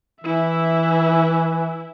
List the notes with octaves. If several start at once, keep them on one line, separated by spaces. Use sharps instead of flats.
E3 E4 E5